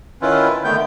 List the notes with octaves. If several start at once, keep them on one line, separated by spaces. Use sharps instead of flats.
D#3 C#4 E4 F4 B4
D3 D#3 A3 B3 G5 G6